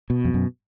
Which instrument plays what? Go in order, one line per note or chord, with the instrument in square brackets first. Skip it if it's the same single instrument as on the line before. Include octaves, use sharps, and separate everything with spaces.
[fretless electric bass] B2
F2
F#2